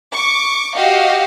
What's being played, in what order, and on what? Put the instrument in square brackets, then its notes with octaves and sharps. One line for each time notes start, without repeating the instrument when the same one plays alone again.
[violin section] C#6 D6
F#4 G4 D#5 F5